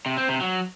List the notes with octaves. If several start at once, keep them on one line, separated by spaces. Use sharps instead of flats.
C3
C4
C3
F#3